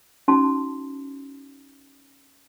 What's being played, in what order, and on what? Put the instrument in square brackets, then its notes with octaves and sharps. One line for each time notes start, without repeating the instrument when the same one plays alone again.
[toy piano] C#4 D#4 F#4 A5 C6